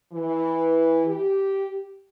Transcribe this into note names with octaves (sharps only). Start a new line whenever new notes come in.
E3
G4